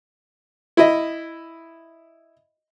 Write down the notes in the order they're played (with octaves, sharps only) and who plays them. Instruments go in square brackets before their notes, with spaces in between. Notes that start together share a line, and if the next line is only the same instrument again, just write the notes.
[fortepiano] E4 D#5